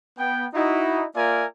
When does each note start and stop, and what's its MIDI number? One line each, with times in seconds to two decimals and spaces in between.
0.19 0.46 59
0.19 0.46 79
0.54 1.05 63
0.54 1.05 64
0.54 1.05 66
1.16 1.46 58
1.16 1.46 65
1.16 1.46 70
1.16 1.46 74
1.16 1.46 76
1.16 1.46 80